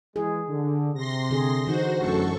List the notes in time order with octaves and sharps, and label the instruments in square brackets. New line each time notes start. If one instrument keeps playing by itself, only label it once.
[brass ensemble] E3 G#3 [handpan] G#4
[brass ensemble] D3
[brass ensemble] C3 [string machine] C6 A#6
[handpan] D3 G#4
[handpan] D3 E3 D#4 [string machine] F#4 C5
[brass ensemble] A1 F#4 [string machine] F#2 A4 C#6